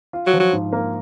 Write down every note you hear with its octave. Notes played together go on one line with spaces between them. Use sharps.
F4
F#3
F3
F#3
G#2
A#3